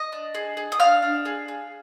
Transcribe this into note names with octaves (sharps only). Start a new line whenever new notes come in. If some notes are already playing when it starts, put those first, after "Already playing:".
Already playing: D#5 D#6
D4
G#4
G#4
D#6
D4 F5 F6
D4
G#4
G#4